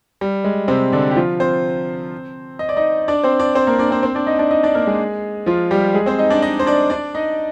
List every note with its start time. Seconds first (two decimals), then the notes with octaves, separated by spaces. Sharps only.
0.21 G3
0.44 G#3
0.68 C3 C4
0.93 D3 D4
1.11 G4
1.16 F3 F4
1.40 C4 C5
2.59 D#5
2.69 D5
2.77 D#4 D#5
3.08 D4 D5
3.23 C4 C5
3.40 D4 D5
3.55 C4 C5
3.67 A#3 A#4
3.79 D4 D5
3.91 C4 C5
4.03 C4 C5
4.15 D4 D5
4.27 D#4 D#5
4.39 D4 D5
4.51 D#4 D#5
4.63 D4 D5
4.75 A#3 A#4
4.87 G#3 G#4
5.46 F3 F4
5.71 G3 G4
5.94 G#3 G#4
6.06 C4 C5
6.18 D#4 D#5
6.30 D4 D5
6.42 D#4 D#5
6.59 C5
6.66 D4 D5
6.90 D4 D5
7.15 D#4 D#5